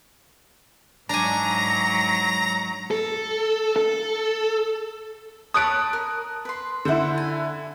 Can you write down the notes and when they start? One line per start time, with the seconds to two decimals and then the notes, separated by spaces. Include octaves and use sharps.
1.09 G#2 F#3 D4 G#5 A#5 A#6
2.91 A4
3.76 A4
5.54 C#5 A5 B5 D#6 F#6 D7
5.93 A#4
6.45 B4 C6
6.85 D3 E4 C5 F#5
7.18 G#5